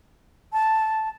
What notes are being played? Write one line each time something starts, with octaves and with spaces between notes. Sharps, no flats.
A5